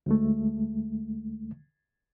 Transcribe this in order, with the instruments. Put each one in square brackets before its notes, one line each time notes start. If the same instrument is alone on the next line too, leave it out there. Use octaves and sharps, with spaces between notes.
[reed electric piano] D2 G#3 A3